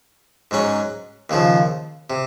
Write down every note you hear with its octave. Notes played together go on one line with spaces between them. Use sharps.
G#2 F#3 C#4
D#2 C#3 F3
C3